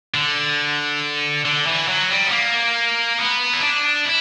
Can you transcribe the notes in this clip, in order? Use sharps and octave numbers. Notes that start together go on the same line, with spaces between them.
D3
D3
E3
F#3
G3
B3
A#3
B3
E4
D4
E4